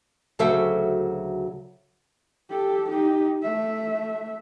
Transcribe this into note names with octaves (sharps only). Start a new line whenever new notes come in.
D2 C#3 F#3 A4 C5 E5
G4 A4
D#4 G4
A3 E5